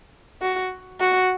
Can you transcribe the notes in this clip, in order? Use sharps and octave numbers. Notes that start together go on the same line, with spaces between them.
F#4
F#4